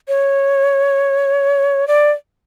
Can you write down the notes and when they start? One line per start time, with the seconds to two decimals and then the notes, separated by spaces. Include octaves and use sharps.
0.08 C#5
1.88 D5